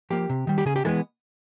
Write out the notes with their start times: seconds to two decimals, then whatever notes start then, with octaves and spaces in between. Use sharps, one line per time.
0.10 F3 A#3 G4
0.29 C3
0.47 D#3 G3
0.58 G4
0.66 C#3 G#4
0.76 G4
0.85 E3 G#3 B3 A4